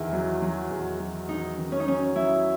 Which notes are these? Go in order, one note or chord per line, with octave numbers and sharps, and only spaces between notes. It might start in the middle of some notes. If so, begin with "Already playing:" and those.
Already playing: E2 D#3 E4
F#3
F#3
E2
F#3
E2 D#4
D#3
C#4
D#4
F#3 C#4
F#3 E4